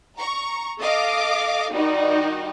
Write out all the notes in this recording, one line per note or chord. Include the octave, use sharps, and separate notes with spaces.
A#5 C#6
A4 D#5 F5 D6
D#3 G3 D#4 F#4